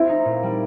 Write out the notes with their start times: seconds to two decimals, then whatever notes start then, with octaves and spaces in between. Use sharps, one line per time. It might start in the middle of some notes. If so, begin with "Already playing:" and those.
Already playing: C4 E4
0.09 D#4
0.25 A#2
0.43 G3